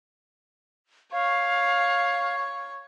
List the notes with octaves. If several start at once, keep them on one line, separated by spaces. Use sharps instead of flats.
C#5 F5